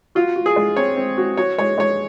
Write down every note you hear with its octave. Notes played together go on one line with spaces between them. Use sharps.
F4 F#4
F#4
G#4
G#3
C4 C#5
C4
F#4
F#4 C#5
G#3 C#5
G#3 C#5